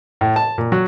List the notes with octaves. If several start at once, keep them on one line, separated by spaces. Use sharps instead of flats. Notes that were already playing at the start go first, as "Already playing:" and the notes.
A2
A5
A#2
F#3